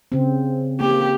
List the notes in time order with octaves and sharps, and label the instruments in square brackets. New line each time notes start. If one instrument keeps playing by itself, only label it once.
[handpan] C#3 C4
[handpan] A#3 [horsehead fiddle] G4